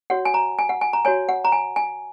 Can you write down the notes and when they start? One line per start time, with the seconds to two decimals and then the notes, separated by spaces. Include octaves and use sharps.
0.10 F#4 C#5 F#5
0.25 G#5
0.34 A#5
0.59 G#5
0.69 F#5
0.81 G#5
0.93 A#5
1.05 F#4 C#5 G#5
1.29 F#5
1.45 A#5
1.52 G#5
1.76 G#5